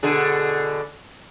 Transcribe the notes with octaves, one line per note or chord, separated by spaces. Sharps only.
B2 D3 G#4